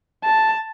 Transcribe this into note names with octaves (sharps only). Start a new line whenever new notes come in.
A5